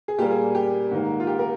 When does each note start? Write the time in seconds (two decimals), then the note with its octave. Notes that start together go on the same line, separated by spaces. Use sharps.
0.08 G#4
0.18 A#2 G3 A#3 G4
0.31 G#4
0.55 G4
0.91 G#2 D#3 A#3
1.20 F4
1.27 G4
1.39 A#4